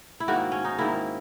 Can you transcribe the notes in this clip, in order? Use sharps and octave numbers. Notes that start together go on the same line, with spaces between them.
E4
G#2 D#3 A#3 F#4
C#4
D#4
G#2 D#3 A#3 E4